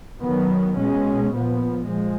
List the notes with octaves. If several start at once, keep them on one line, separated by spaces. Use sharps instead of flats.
D#3 F#3 B3
B2 G#3 C#4
A#2 F3 B3
F3 G#3